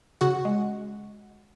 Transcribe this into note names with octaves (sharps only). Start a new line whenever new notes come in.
C#3 F#4 F#5
G#3